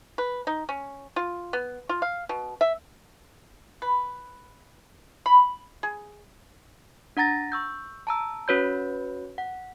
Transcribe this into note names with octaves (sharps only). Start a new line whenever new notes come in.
B4
D#4
C#4
F4
B3
F4
F5
B2
E5
B4
B5
G#4
D4 F#5 A#5 A6 A#6
C#6 E6 G6
A5 A#5 E6
C#4 F#4 B4 C#5 B5 G6
F#5